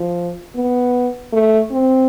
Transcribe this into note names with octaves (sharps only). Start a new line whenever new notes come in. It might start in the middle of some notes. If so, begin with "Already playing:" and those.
Already playing: F3
B3
A3
C4